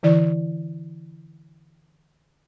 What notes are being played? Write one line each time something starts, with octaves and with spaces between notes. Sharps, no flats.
D3 E3 E4 D5